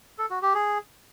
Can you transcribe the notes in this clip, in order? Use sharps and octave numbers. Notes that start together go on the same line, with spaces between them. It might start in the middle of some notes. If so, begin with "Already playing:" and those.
A4
F#4
G4
G#4